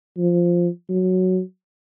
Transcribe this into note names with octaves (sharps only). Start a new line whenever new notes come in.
F3
F#3